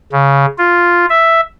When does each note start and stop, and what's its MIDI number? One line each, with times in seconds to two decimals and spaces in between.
0.12 0.46 49
0.58 1.06 65
1.10 1.41 76